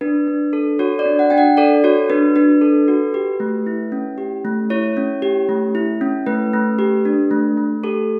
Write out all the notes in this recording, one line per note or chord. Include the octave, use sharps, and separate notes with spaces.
D4 B4
D4
A4
F#4 C#5
D5
D4
F#5
D4 G5
F#5
A4 D5
F#4 C#5
D4 B4
D4 B4
A4
F#4
G4
A3
E4
C#4
G4
A3
E4 C#5
C#4
G4
A3
E4
C#4
A3 B4
A3
G4
D4
A3
A3
G4 A4